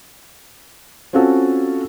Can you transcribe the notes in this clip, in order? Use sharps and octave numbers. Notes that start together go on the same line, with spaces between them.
C4 C#4 F4 F#4 A4